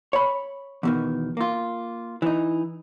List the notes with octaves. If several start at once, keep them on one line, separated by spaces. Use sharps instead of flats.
C#5 B5
E2 B2 D#3
A#3 F4
E3 D#4